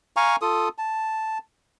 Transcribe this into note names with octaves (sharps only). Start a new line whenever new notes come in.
F5 G#5 A#5 C#6
F4 A4 D#6
A5